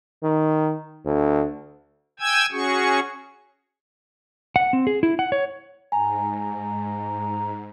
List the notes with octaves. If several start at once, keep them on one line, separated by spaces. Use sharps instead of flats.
D#3
D2
G5 G#5 E6 G#6
C#4 F#4 G#4 C#6
F#5
C4
G#4
E4
F#5
C#5
G#2 G#5 A#5